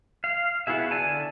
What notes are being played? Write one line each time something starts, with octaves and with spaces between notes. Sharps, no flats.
F5
B3 E4 F#4 G#4 E5
D3 D5 G#5 A5